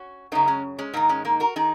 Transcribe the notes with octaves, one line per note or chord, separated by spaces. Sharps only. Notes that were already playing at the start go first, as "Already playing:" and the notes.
Already playing: C#4 F#4
F#2 C#3 A#3 D#4
G#3 C#4
G#3 C#4
G#2 D#3 A#3 D#4
G#3 C#4
A#3 D#4
F#4 A#4
D#3 D#4 G#4